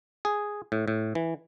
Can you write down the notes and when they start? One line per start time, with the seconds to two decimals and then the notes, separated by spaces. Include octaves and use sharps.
0.25 G#4
0.72 A2
0.88 A2
1.15 E3